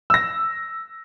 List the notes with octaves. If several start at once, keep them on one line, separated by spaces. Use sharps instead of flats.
E6 A#6